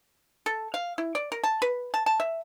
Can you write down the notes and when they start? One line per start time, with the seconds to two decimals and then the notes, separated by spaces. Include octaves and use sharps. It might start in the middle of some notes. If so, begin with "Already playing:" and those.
0.46 A4
0.74 F5
0.98 E4
1.15 D5
1.32 A#4
1.44 A5
1.62 B4
1.94 A5
2.06 A5
2.20 E5